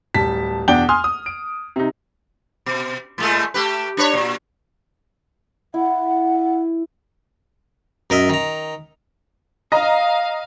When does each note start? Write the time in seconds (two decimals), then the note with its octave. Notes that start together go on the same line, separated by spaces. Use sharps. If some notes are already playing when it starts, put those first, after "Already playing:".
0.14 D1 G3 A5 B6
0.68 E2 B2 D4 F#5 G5 G7
0.89 G#5 C6 D#6 F6
1.04 D#6
1.26 D7
1.76 C3 D#4
2.66 B2
3.18 A2 G#3 A3
3.54 A3 G4 B4
3.97 D4 B4 C#5
4.13 A#2
5.74 E4 F#5
8.10 F#2 A#4 D#5 E5
8.29 D#3 A#5
9.72 D#5 F5 A#5